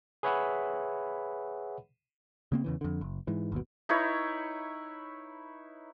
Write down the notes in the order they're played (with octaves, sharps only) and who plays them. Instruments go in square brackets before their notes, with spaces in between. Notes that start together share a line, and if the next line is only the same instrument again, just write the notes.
[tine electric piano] G#4 B4 C#5 E5 F#5 B5
[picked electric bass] C#3 A#3 C4
E2 C#3 E3
F2 D3
F#1
G#2 E3
G1 D#2 B2
[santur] D#4 E4 B4 C#5